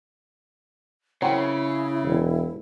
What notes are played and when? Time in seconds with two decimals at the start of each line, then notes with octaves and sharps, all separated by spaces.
1.22 C#3 F#3 C4 E4 A#4
2.04 E1